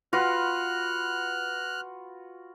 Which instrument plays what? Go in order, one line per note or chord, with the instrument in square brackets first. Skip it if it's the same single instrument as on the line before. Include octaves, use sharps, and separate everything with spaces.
[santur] F4 F#4 B4 [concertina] F6 F#6